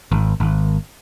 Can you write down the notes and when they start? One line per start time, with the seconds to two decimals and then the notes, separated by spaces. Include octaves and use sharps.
0.12 G#1
0.40 G#1